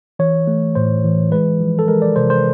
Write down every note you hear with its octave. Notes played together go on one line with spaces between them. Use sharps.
E3 C#5
A3
A2 C5
E3
G#3 B4
F3
A4
G#3 A#4
D5
C3 C5
C5